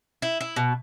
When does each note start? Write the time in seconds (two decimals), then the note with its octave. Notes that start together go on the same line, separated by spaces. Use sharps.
0.22 E4
0.41 E4
0.56 B2